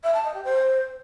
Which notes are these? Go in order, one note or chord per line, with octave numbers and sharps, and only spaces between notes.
E5
A5
D#5
G4
C5